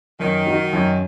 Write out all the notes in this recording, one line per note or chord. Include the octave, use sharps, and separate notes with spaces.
F#2 D#3
F#3 D#4
F#2